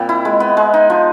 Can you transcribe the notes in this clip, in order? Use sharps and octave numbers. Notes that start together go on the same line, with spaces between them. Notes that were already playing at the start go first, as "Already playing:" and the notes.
Already playing: A#2 G3 C4
E4
G#3
B3
G#3
D#4
F3